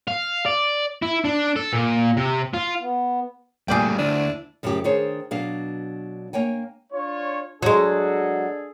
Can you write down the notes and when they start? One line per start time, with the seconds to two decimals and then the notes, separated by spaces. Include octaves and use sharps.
0.08 F5
0.46 D5
1.03 E4
1.25 D4
1.56 A4
1.73 A#2
2.17 C3
2.54 F4
2.79 B3
3.68 G1 A#2 G3 A3 G#4 D5 G5
3.99 D2 D4 E4 D#7
4.63 F#2 C#3 F3 A3 E4 G4
4.84 D#3 D4 G#4 C5 C#5
5.31 B2 F#3 D4 F5
6.33 A#3 C#5 G5 G#5
6.92 D4 F4 C#5
7.62 F#3 G#3 D4 G#4 A4